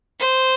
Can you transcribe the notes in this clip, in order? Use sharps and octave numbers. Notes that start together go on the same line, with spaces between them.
C5